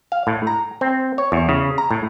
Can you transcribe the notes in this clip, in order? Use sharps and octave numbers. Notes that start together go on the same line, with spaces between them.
F5
A2
A#5
C4
C#5
E2
C#3
A#5
A2